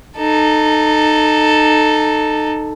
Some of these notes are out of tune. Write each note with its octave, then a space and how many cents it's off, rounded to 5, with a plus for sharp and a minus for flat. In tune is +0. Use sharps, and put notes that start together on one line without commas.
D#4 -20 A4 +0